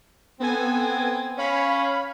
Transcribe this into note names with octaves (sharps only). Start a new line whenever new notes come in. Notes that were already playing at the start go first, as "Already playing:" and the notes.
B3 C4 A4 G#5
C#4 C#5 F5 B5